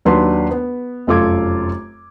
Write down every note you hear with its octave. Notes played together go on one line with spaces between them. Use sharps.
D#2 F#3 D4 B4 C6
B3
F1 F#2 F4 A4 D6 G#6